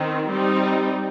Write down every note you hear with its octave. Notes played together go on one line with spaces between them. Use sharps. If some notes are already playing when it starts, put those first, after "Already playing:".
Already playing: D#3 C4
G3 C4 D#4